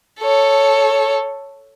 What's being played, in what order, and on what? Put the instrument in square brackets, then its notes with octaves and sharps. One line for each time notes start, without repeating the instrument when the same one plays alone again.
[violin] A4 C#5